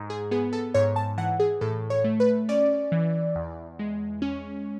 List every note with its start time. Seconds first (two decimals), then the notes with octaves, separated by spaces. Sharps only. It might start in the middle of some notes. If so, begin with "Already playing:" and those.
Already playing: G#2
0.10 G#4
0.31 B3 G#4
0.53 A4
0.74 G#2 C#5
0.96 A5
1.18 E3 F#5
1.40 G#4
1.61 A2 A4
1.90 C#5
2.04 A3
2.20 B4
2.49 C#4 D5
2.92 E3
3.35 E2
3.79 G#3
4.22 C#4